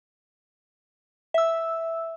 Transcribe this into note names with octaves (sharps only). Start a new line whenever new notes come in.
E5 E6